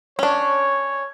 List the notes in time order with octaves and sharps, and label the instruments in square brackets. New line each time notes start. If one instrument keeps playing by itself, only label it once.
[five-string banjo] C#4 D4 [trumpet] C#5